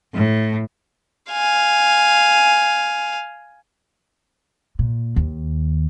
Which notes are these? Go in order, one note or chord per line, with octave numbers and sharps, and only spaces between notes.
A2
F5 G#5
A#2
D#2